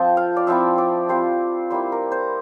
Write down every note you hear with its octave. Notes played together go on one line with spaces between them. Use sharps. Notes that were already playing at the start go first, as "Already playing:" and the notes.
Already playing: F3 A3 C4 F4 G5 A5
F5
D5
F3 C4 E4 E5
D5
G3 C4 F4 C5
G3 A#3 E4 C5
A#4
C5